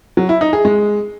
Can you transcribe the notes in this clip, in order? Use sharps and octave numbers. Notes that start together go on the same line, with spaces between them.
F#3
E4
D#4
G#4
G#3